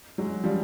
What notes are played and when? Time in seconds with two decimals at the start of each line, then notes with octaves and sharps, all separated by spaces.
0.18 F#3 G#3
0.44 F3 G3